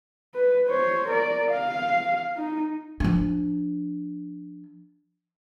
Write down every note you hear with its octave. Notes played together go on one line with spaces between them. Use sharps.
B4
C5 C#5
A#4 D5
F5
D#4
F3 D4